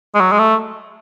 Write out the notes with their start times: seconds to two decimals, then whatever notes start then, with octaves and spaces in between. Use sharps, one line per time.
0.15 G#3
0.20 F#3
0.32 G#3
0.39 A3